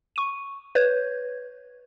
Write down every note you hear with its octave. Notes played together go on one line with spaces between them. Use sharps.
C#6 D#7
B4 C#5 G6 G#6